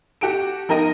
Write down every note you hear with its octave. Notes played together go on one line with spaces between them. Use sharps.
F#4 G4 A4 D7
F3 D#4 A#4 G5 A#6 D#7